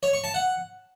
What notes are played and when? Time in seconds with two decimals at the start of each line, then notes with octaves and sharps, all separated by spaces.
0.03 C#5
0.13 C#6
0.24 A5
0.34 F#5